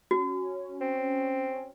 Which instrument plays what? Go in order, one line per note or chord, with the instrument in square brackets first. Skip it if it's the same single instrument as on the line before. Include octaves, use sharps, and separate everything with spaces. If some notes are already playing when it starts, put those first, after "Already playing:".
[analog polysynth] C#4 [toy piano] F#4
[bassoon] C4